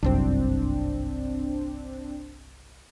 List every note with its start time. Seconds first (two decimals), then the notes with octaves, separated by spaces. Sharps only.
0.03 G1 C2 F#2 C4 D4